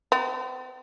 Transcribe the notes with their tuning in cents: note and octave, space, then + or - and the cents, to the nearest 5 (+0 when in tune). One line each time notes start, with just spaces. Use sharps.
C4 -45